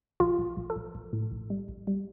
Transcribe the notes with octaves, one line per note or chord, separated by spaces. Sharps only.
A#1 F4
A#1
A#1
A4
A#1
A#1
A2
A#1
G3
A#1
G3